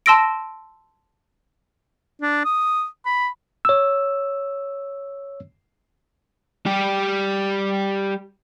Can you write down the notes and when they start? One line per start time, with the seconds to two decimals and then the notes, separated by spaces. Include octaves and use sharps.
0.06 A5 C6 E6 A#6 D7
2.22 D4
2.45 D#6
3.06 B5
3.65 C#5 E6
6.66 G3 G4